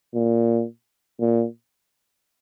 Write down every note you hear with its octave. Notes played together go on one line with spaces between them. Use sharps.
A#2
A#2